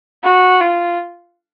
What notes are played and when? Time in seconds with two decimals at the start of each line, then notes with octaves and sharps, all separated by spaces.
0.23 F#4
0.61 F4